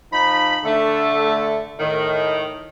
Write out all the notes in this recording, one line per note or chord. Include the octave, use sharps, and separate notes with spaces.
F3 D#4 B5
D3 A3
A2 D#3